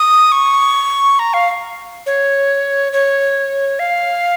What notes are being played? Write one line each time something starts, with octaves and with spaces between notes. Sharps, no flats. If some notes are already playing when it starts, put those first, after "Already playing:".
Already playing: D#6
C#6
A#5
F5
C#5
C#5
F5